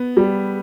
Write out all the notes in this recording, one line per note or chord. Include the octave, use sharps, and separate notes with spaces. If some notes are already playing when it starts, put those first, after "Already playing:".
Already playing: B3
G3